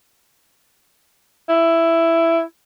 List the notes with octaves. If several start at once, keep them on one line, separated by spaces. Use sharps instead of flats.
E4